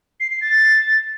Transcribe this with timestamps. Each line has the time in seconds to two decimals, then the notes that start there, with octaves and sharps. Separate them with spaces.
0.20 C7
0.31 C7
0.41 A6